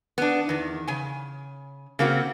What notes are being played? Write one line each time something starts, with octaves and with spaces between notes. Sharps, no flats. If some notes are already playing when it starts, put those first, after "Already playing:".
B3 D4
E2 D#3
C#3 G#5
C#3 A#3 C4 F#4